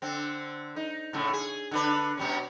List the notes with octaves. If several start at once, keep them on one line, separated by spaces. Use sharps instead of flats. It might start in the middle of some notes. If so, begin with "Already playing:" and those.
D3 C4
D#4
A2 C#3 A3
G#4
D3 D4 B4
B2 G3 C#4